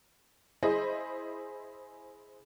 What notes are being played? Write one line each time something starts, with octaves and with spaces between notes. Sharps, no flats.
E4 G#4 C5 D#5